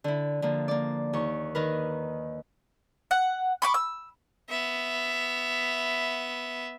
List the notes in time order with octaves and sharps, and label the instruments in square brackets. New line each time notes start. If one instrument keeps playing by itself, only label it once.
[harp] D3 E4
D3 F3 A#3
A#3 D5
D#2 C#6
D#3 A#4 B4
[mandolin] F#5
B5 C#6 D6
E6
[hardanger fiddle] B3 E5